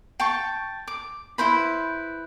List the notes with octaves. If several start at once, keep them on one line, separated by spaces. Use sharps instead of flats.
G5 A5 C#6
D6
E4 B4 C5 B5